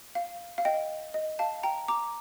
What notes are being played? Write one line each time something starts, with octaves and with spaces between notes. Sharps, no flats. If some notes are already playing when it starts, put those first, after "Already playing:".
F5
F5
D#5 G5
D#5
F5 A5
G5 A#5
A#5 D6